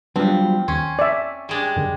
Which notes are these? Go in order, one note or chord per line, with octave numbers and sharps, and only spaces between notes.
F#3 G3 B3 C4 D4 F4
D#2 C#4 C6
D5 E5
G3 G#3 D4
F#2 D3